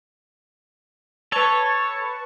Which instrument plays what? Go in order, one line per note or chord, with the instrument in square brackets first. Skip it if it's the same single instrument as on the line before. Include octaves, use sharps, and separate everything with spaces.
[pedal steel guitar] A4 C#5 [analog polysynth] B4 A5 C#6